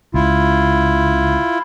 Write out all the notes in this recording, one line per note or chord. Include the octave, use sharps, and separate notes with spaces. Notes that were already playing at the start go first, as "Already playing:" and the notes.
C#2 E4 F4